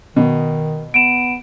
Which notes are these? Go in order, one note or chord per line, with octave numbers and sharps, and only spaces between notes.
B2 D#3
B3 D7 E7